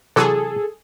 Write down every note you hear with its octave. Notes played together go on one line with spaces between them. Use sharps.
C3 E3 F#3 G#4 A4